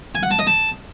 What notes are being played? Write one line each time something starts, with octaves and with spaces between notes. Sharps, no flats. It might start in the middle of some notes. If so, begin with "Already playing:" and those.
G#5
F#5
A5
D#5
A5